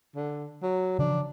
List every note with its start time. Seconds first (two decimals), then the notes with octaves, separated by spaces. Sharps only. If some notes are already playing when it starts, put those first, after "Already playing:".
0.15 D3
0.62 F#3
0.99 C#3 E3 F3 D4